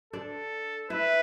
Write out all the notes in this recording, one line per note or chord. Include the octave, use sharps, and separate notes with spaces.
D4 A4 D5
E4 B4 E5